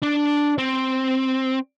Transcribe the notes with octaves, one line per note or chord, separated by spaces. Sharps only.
D4
C4